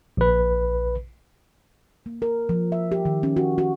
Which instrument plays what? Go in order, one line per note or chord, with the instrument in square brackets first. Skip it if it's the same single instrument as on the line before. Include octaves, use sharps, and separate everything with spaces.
[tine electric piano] A#1 B4
[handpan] A#3
A#4
F3
E5
G4
D#3
C#4
F#4
F#4